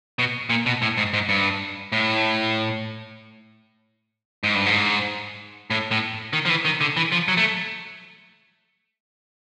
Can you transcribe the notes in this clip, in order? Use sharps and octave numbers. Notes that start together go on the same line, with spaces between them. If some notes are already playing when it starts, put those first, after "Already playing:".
B2
A#2
B2
A2
G#2
G#2
G2
A2
G#2
G2
G#2
A2
A2
D#3
F3
E3
D#3
D3
E3
F3
F#3
A3